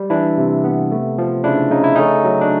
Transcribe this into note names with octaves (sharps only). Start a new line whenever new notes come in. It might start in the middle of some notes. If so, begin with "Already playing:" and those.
Already playing: G3
E3 D4 E4
C3
B3
A3
F3
C#3 D4 E4
C#3 D#4
E4
A3 C#4 D#4
F#3
D4